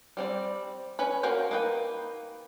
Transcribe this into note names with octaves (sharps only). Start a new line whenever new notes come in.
G3 C4 D5
C#4 B4 B5
A#3 F#4 A#4 F5 G5
A#3 D#4 B4 C#5 G5